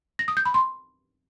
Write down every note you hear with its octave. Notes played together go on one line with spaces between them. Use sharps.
A#6
D#6
G6
B5
C6